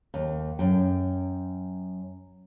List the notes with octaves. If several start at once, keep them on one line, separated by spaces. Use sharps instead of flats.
D#2
F#2 G5